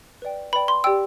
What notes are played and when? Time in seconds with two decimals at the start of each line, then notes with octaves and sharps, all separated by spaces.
0.22 B4 D5 G5
0.53 B4 D5 G5 B5
0.68 C6
0.84 G4 D5 G5 E6